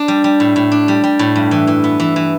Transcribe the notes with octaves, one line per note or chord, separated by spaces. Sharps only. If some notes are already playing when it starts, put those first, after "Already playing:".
Already playing: D4
G3
G3
A2
A2
D4
G3
G3
A2
G2
E3
E3
B3
E3
E3